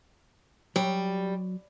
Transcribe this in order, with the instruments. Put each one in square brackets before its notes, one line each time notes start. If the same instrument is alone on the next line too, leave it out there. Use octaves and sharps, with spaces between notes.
[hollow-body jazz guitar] F#3 [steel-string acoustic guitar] G3